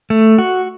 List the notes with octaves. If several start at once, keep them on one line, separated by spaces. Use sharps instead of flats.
A3
F#4